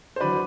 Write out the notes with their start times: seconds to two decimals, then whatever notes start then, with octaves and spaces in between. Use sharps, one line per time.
0.16 C5
0.21 D3 F#3 B4 D5